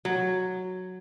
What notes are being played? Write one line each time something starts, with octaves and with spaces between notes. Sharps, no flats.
F#3